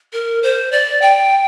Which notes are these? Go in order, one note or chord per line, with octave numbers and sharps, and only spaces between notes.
A#4
C5
D5
G5